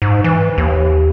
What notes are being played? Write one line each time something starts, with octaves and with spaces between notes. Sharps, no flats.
G#2
E3
D#2